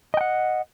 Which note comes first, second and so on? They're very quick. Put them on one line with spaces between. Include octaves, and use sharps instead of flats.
D#5 G5 F#5